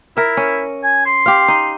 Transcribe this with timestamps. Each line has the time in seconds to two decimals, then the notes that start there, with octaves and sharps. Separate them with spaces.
0.17 E4 A#4 E5
0.37 C#4
0.84 G#5
1.06 C6
1.26 G4 F5
1.48 D#4